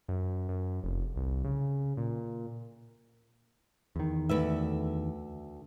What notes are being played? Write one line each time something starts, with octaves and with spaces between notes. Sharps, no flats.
F#2
F#2
F1
C2
C#3
A#2
E2 D#3
D2 B4 E5